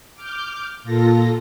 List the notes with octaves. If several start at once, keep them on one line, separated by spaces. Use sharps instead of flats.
D6 F6 G6
A#2 F4 A4 A#6